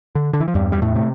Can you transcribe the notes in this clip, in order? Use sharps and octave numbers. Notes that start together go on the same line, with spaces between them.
D3
D3
E3
F3
E2 G2 G3
G3
A2 A3
C3 A3